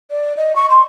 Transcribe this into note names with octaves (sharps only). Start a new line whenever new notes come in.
D5
D#5
C#6
C6